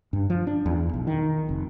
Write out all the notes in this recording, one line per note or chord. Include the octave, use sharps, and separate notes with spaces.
G2
F3
D4
E2
B1
D#3
F1